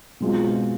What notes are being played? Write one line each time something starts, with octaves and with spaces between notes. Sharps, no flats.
B2 G#3 C4 F4